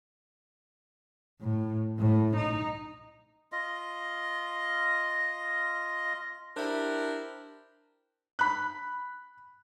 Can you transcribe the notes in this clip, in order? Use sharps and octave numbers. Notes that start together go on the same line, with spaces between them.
A2
A2
D#4
F4 D#5
D4 E4 G4 A#4 C5
B5 F#6